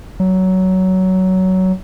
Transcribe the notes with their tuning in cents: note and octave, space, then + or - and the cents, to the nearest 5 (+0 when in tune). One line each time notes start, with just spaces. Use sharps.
F#3 +15